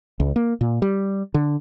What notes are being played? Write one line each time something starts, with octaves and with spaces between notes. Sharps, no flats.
C#2
A#3
A#2
G3
D3